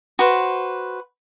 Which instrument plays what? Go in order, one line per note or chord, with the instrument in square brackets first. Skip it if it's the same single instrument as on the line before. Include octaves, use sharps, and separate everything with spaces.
[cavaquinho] F#4 B4 C5